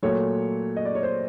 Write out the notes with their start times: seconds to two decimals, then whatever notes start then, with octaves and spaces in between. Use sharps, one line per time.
0.03 A#2 F#3 A3 C#5
0.77 D#5
0.85 D5
0.95 C#5
1.03 C5